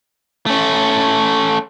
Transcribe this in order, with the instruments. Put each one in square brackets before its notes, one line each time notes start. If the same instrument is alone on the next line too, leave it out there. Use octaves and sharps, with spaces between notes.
[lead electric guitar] A3 C#4